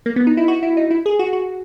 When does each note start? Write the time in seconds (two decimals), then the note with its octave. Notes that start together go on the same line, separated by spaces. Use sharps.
0.06 A#3
0.16 B3
0.27 D#4
0.37 E4
0.48 F#4
0.63 E4
0.77 D#4
0.91 E4
1.06 G#4
1.19 F#4
1.33 F#4